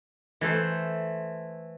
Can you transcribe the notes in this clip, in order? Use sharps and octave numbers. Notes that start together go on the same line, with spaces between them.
E3 A3 A4 C5